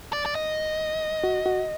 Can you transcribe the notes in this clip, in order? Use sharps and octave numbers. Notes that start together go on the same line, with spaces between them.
D5
D5
D#5
F#4
F#4